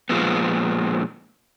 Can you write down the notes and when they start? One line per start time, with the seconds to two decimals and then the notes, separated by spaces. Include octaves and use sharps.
0.09 A#2 F3 G#3 B3